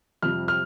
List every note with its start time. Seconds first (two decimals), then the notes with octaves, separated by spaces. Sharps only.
0.22 F2 C3 G3 F6
0.48 F6